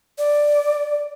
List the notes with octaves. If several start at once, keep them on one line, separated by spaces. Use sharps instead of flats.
D5